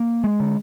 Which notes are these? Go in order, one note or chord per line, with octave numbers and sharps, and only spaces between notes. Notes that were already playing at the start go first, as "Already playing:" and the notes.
Already playing: A#3
G#3
D3